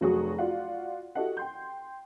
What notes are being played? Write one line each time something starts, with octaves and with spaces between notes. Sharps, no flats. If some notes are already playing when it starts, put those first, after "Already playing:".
F1 F#3 F#4 G#4 C#6 D#6
F4 F#4 D5 F5 F#5
E4 F#4 G4 A4 D#5 F#5
G5 C6 G6